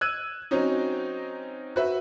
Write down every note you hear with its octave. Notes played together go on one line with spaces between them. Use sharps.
E6 F#6 G#6 D#7
F#3 C4 C#4 D#4
F#4 B4 E5